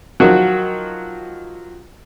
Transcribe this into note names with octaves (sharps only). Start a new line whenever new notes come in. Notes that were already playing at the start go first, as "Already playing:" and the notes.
D#3 F3 F#3 F#4